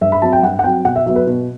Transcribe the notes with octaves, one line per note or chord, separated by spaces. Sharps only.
G2 E5
B5
F#3 C4 A5
G5
G2 F#5
F#5
F#3 C4 G5
B2 F#5
E5
F#3 B3 E5
B4
B2